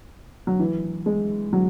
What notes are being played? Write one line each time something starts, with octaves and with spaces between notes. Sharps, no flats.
F#3
E3
G#3
F#3